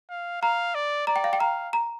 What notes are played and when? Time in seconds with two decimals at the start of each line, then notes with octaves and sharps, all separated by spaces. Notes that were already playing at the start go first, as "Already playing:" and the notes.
0.10 F5
0.42 F5 A#5
0.75 D5
1.07 D5 A#5
1.16 G5
1.24 F5
1.33 G5
1.40 F5 A#5
1.73 A#5